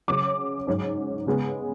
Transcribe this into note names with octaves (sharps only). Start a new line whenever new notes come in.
C#3 F#3 C#4 D6
G#2 F#3 C#4
C#3 G#3 B3